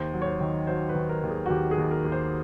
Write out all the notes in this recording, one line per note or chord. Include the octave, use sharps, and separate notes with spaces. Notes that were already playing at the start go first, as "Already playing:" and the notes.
Already playing: D#2 C5
F#3
C#5
C5
D#3
F#3 C5
B4
D#3
A#4
D#2
G#4
F#4
D#2 G4
G#4
D#2
A#4
D#2
C5